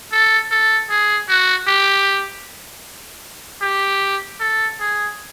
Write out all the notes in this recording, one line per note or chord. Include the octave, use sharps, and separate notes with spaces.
A4
A4
G#4
F#4
G4
G4
A4
G#4